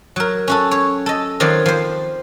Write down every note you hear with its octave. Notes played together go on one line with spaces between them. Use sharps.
F#3 A#4
C#4 F#4 A4
C#5
A4 D#5
D#3 F3 F#3 C4 D5
F3 C5